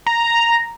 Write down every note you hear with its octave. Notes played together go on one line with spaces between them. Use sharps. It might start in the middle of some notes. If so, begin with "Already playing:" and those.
A#5